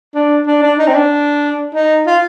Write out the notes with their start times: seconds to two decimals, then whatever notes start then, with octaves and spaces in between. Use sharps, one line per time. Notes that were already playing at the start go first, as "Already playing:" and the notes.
0.14 D4
0.46 D4
0.62 D4
0.78 D#4
0.87 C4
0.94 D4
1.74 D#4
2.06 F4